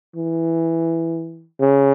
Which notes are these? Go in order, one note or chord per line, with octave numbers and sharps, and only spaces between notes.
E3
C#3